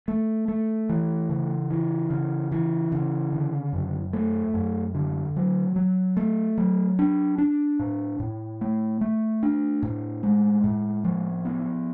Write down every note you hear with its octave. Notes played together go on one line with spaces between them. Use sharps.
A3
A3
E3
C#3
E3
C#3
E3
C#3
D3
F#2
A3
F#2
D3
F#3
F#3
A3
F#3
D4
D4
A2
A2
A3
A3
D4
A2
G#3
A2
F3
B3